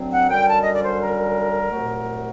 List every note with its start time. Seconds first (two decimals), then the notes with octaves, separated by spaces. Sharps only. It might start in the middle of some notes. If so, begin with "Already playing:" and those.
Already playing: D2 D3 F#3 C4
0.11 F#5
0.29 F#2 D3 G3 G5
0.47 A5
0.61 D#5
0.72 D5
0.83 C5
1.00 A#4
1.71 C2 A#2 F#3 A3